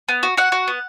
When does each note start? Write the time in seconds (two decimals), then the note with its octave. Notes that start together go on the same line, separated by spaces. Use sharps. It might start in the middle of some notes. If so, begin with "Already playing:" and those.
0.09 B3
0.23 F#4
0.37 F#4 F#5
0.52 F#4
0.68 B3